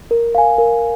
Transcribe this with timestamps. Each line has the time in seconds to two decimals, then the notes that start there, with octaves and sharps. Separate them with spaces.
0.11 A#4
0.35 F5 G#5
0.58 A#4